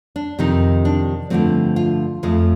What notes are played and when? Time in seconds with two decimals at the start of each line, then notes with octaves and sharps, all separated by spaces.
0.16 D4
0.39 F2 C3 D#3 D#4
0.85 D4
1.30 G2 D3 F3 A3 C4
1.76 F4
2.23 F2 C#3 F3 A3